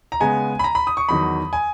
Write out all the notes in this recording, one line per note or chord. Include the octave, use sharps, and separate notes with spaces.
A#5
C#3 G#3 B3 G#5
B5
A#5
B5
D#6
C#6
E2 D#3 F#3 B5
G#5